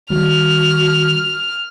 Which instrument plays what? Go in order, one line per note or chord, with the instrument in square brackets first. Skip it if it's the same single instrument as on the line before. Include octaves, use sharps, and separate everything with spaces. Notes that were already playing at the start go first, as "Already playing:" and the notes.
[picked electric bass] D#3 G3 [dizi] F#4 [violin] F6